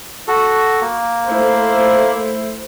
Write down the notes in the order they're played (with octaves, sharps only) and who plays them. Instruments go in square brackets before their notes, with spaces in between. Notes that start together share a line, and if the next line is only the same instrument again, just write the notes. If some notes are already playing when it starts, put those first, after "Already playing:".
[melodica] F#4 A4
A#3
[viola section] A3 E4 C5